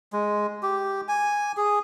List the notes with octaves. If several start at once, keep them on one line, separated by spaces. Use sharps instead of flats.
G#3
G4
G#5
G#4